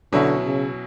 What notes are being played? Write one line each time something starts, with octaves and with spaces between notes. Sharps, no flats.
B2 D3 F#3 C#4 E4
C#3